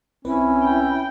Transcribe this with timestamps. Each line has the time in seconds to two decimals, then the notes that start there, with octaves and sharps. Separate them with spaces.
0.25 B1 C4 C#4 E4 B4
0.63 G5